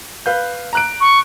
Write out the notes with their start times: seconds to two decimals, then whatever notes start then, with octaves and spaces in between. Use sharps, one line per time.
0.26 B4 F5 G6
0.73 A#5 F#6 D7
1.01 C#6